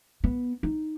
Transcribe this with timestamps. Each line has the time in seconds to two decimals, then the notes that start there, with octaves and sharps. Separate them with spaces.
0.24 B3
0.63 D#4